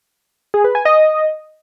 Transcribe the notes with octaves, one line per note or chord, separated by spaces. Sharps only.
G#4
B4
G#5
D#5